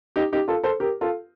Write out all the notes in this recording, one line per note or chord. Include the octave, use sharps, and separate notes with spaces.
D#4 G4
D#4 G4
F4 A4
A4 C5
G4 A#4
F4 A4